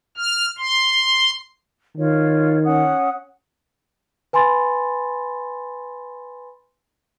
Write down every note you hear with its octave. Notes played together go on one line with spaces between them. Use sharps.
F6
C6
D#3 F4 C#5
C#4 F#5 D#6
B4 G#5 B5 C6 A6